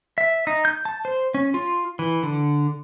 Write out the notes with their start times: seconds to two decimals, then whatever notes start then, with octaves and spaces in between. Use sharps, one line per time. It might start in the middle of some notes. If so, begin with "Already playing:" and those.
0.18 E5
0.47 D#4
0.65 G6
0.85 A5
1.05 C5
1.34 C#4
1.54 F4
1.99 E3
2.23 D3